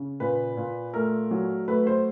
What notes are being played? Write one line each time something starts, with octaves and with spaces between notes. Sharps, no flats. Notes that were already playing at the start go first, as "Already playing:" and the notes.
Already playing: C#3
A#2 B4
A#2
A3 A#4
F#3
A3 B4
C5